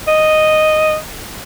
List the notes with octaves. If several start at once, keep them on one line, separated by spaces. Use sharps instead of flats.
D#5